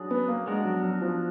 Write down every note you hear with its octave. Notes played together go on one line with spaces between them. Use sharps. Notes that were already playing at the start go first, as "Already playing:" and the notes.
Already playing: F#3 D4 G#4 B4
B3
A#3
G#3 B3 D4 F#4 A#4
F#3
F#3
F3